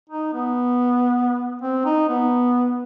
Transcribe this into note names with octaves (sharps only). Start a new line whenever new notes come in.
D#4
B3
C4
D#4
B3